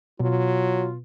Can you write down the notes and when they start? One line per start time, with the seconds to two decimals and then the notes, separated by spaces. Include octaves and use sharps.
0.20 B2 F#3 F4